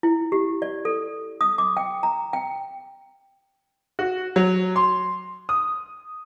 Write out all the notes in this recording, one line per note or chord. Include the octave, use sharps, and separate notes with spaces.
E4
G4
D5
A4
D#6
D6
G5
A#5
G5
F#4
F#3
C6
D#6